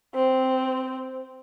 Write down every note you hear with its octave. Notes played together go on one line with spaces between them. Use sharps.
C4